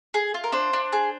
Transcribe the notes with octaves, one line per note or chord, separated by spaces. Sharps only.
G#4
F4
A#4
D4 C5
D4
G#4